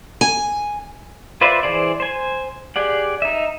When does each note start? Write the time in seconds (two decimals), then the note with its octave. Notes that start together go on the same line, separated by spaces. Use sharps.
0.21 G#5
1.41 F4 B4 C5 D5 E5
1.63 E3 G#4 C5 D5
2.00 C5 G#5
2.76 G4 G#4 D5 F#5
3.22 D#4 E5